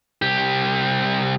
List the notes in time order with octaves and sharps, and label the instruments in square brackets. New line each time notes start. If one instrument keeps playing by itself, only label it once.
[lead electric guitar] C2 G4